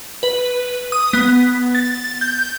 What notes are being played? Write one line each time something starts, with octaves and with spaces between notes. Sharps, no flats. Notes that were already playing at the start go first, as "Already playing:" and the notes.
B4
D#6
B3
A6
G6